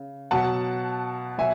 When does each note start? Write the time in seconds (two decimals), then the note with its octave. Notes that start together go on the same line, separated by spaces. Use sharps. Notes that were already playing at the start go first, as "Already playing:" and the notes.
Already playing: C#3
0.31 B2 F#3 F#5 A5
1.38 B2 F#3 E5 G#5